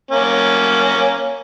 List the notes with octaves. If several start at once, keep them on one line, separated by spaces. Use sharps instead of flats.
A#3 C#4